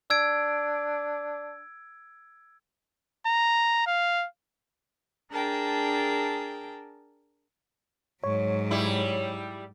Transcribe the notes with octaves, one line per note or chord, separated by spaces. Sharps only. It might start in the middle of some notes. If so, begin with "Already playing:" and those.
D4 E6 G#6 D7
A#5
F5
D4 G#4 A#4 G5 A5
G#2 F#3 C#5
G3 E4